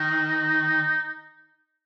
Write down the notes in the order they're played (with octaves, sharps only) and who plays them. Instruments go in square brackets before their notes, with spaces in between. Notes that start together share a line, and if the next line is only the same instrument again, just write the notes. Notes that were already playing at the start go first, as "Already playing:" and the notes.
Already playing: [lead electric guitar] D#3 [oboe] D#4